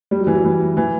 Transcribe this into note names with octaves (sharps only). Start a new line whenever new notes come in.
G3
F#3
E3
F#3
E3
E3